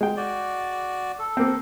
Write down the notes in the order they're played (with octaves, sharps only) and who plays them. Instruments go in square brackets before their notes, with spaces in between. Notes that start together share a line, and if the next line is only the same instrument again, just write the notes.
[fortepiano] G#3 G5
[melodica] F#4 D5
A4
[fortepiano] A#3 C4